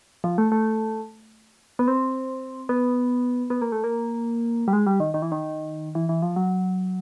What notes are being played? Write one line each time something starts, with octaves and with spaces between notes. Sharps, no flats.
F3
A3
A3
B3
C4
B3
B3
A#3
A3
A#3
G3
G#3
G3
D#3
D#3
E3
D#3
E3
E3
F3
F#3